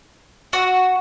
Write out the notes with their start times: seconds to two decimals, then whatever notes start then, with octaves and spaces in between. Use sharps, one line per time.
0.53 F#4